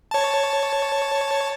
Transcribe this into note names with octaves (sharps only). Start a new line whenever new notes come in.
C#5 A5